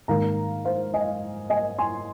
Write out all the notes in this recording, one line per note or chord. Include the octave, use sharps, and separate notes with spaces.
G#2 D#3 A#3 F5 A#5
C5 F5
D#5 G#5
D#5 G#5
G#5 C6